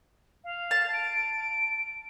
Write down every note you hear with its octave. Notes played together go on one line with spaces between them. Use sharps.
F5
A5
D7